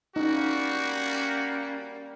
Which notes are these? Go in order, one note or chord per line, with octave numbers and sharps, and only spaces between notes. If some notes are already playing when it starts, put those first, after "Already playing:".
G3 A#3 C#4 D#4 F#4